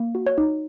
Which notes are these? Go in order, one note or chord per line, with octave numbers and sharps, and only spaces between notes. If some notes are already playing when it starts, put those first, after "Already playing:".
Already playing: A#3
F#4
C#5
D#4